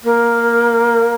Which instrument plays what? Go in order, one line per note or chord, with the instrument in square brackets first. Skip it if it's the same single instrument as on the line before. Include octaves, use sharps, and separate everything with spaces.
[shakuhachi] A#3